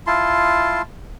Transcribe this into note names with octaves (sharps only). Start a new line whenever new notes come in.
E4 F4 A5 C6